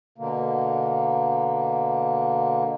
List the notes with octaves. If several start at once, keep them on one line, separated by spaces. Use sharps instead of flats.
B2 D3 A#3